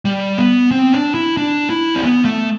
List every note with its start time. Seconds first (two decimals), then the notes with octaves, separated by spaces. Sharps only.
0.05 G3
0.38 B3
0.71 C4
0.92 D4
1.14 E4
1.37 D4
1.70 E4
1.95 C4
2.02 B3
2.25 A3